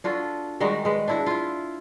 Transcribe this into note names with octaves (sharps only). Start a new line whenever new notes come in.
D4 F4 F#4 A4
D#3 G3 G#3 F#4
G#3 B4
D4 E4 F#4
E4 F4